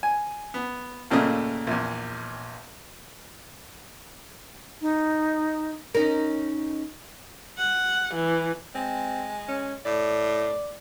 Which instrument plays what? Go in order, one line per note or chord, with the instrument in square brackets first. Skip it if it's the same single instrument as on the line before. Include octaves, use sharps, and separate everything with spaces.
[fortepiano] G#5
B3
D#2 A#2 C#3 A3 D#5 D#6
A#1 E2
[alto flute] D#4
[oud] C#4 D#4 A#4
[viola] F#5
E3
[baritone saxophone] G#3 [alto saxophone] C4
[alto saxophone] C#4
[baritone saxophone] A2 [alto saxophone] D5